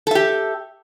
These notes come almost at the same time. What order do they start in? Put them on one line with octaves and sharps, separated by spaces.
A4 E5 G4